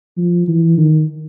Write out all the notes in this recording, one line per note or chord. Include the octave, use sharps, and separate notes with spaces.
F3
E3
D#3